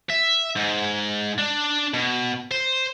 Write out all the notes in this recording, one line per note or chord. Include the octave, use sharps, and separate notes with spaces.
E5
G#2
D4
B2
C5